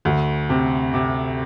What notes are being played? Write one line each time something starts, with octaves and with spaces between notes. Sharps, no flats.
D2
C3
C3